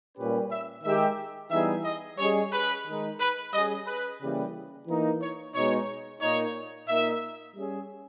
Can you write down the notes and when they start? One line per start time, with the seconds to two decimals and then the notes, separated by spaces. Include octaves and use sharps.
0.17 A#2 G3 C#4 G4 B4
0.50 E5
0.83 D#3 G#3 D#4 G4 E5
1.50 E3 G3 B3 D#4 G#4 E5
1.84 D#5
2.18 G3 C#4 G#4 C#5 D#5
2.52 B4
2.86 D#3 G#3 D#4
3.19 B4
3.52 G3 C#4 G#4 D#5
3.86 B4
4.20 C#3 E3 G3 A#3
4.87 E3 A#3 D#4
5.21 C#5
5.54 B2 G#3 D#4 C#5
6.21 A#2 A#3 D#4 C#5
6.88 A#2 A#3 D#4 A#4 D#5 E5
7.56 G3 C#4 G#4